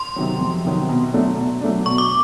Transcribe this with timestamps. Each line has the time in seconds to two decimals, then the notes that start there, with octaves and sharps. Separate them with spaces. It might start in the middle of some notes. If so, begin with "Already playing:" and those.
Already playing: C6
0.16 C3 D#3 F#3
0.41 F2
0.65 C3 D#3 F#3
0.89 B2
1.13 F#3 A3 D4
1.37 B2
1.61 F#3 A3 D4
1.86 B2 C#6
1.98 D6